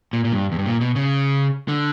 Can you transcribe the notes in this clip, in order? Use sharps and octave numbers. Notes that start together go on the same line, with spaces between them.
A#2
A#2
G2
E2
G2
A#2
B2
C#3
D3